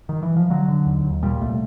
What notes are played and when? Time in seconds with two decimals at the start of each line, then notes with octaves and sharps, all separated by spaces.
0.09 D#3
0.23 E3
0.37 F3
0.50 D3 F#3
0.68 D3
0.87 D#2
1.05 D#2
1.23 A#2 G3
1.41 C2 A3